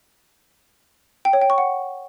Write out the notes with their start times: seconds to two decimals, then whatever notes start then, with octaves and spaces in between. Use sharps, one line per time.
1.25 G5
1.33 C#5
1.42 G5
1.50 C#6
1.58 F#5